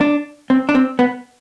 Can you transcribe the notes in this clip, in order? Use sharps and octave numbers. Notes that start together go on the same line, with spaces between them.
D4
C4
D4
C4
B3